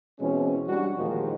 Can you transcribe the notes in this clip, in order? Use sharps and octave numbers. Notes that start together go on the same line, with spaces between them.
B2 E3 G#3 C4 C#4
G3 D4 F#4
A1 D#2 A#2 D#3 F3 G#3